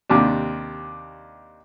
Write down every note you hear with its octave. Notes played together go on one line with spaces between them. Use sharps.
D#2 C3 D4